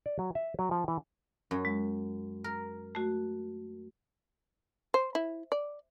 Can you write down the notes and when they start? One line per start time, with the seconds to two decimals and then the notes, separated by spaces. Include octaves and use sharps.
0.06 D5
0.19 F#3
0.35 E5
0.59 F#3
0.71 F3
0.88 E3
1.51 F#2
1.65 G#3
2.44 A#4
2.95 A3 F#4
4.94 C5
5.15 E4
5.52 D5